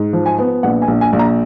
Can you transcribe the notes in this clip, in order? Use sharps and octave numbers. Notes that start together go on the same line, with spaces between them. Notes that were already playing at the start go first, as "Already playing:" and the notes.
Already playing: G#2
F3
G#5
B3
A#1 F#5
G#5
A#1
G#5
A#1
A#5